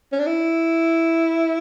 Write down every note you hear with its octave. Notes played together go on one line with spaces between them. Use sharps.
C#4
D4
E4